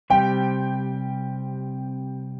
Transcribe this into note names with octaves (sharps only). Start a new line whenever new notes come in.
C3 G3 C4 G4 G5